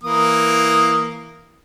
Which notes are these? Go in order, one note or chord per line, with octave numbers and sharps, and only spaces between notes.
E3 A#3 D#6